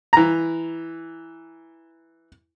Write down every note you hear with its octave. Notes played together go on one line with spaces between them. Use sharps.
E3 A#5